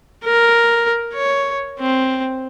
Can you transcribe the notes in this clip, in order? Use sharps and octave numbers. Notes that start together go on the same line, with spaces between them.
A#4
C#5
C4